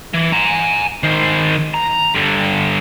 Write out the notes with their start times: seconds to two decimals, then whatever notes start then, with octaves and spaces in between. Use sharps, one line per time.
0.14 E3
0.33 G#5 A#5
1.03 D#3 C5
1.74 A#5
2.14 G2 D3